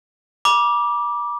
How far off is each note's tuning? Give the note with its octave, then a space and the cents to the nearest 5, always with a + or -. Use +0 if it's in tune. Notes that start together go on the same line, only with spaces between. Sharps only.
B5 -45 D6 +0